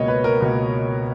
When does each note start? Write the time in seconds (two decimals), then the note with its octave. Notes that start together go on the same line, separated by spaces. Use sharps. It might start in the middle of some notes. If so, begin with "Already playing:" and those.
Already playing: C#2 B2 A#3 C#5 D#5
0.08 B4
0.24 A#4
0.40 C#2 B2 A#3